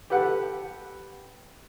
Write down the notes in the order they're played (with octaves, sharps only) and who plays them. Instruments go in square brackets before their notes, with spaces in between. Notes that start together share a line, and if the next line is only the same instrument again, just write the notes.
[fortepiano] G4 A4 B4 F#5